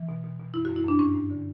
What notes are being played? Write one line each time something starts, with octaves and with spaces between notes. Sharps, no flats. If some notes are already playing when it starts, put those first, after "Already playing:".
Already playing: E3
B2
B2
B2
F#2 E4
F#4
F#2
E4
F#2 D4
G2 C#4
G2
D3